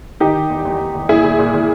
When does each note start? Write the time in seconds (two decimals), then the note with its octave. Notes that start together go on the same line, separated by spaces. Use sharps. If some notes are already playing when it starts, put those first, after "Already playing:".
0.20 D#3 D#4 G4
0.35 D#3
0.50 E2
0.65 E2
0.80 E2
0.95 E2
1.09 A#2 E4 G#4
1.24 A#2
1.39 A#2
1.54 A#2